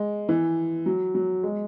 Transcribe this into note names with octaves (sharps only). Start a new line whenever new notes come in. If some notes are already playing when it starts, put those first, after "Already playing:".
Already playing: G#3
E3
F#3
F#3
G#3